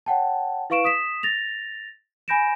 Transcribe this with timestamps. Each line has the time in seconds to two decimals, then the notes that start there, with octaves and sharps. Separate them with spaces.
0.06 C#5 F#5 G5 A5
0.70 E4 B4 F5 C#6 D7 E7
0.84 D#6 B6 E7
1.23 A6 A#6 F7
2.28 G#5 B5 G6 A#6 D7 E7